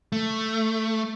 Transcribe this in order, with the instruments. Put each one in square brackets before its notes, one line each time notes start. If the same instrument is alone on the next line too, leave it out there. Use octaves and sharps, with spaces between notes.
[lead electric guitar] A3